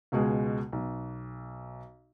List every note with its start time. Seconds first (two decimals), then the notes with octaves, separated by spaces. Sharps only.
0.12 C#2 B2 G#3 G#4
0.73 B1